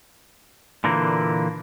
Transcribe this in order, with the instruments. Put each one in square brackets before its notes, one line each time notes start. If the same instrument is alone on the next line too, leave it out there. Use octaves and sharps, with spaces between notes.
[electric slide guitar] A#2 D3 E3 A#3